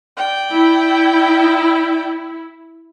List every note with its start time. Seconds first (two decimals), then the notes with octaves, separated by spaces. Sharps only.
0.17 D5 G5
0.52 E4